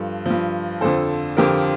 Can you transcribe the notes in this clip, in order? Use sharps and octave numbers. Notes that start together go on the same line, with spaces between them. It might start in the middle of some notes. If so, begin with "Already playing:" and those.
Already playing: G2 F3 A4
G2 F3
F2 D3 F3 A4 C5
F2 D3 F3 G4 A#4